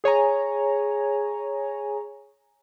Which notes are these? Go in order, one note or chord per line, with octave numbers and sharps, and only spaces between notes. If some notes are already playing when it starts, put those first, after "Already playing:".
G#4 C#5 G#5 A#5